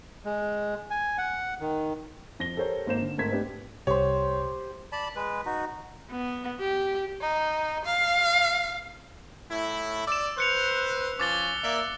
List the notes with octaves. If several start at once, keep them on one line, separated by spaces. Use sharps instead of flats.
G#3
G#5
F#5
D#3
F2 A#6 G7
G4 A4 A#4 C5 C#5
G#1 A#3 C5 E7
D3
G#2 A3 C4 A#4 G#6 B6
A3 B3 C4 D4 G4 B4
C2 G4 C5 C#5
D5 A5 B5
G#3 B4
D#4 F#4
B3
G4
D#4
F5
A2 E4
D5 E6 E7
B4 C5 F#6 C#7 F7
F3 C#4 D6 A6 G7
A#3 D5 E5